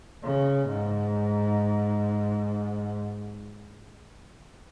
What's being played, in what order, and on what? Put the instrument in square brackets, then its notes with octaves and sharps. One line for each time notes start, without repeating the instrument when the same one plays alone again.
[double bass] C#3
G#2